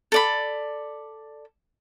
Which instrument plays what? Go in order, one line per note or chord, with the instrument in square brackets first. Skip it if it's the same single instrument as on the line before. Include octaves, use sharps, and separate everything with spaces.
[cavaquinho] A4 D5 B5